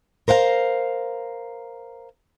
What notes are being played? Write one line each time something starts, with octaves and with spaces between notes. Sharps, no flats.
A#4 C5 F5 F#5 A#5